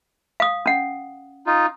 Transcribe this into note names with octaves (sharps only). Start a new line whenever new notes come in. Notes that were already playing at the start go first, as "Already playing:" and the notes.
F5 D#6
C#4 F#5
D#4 F4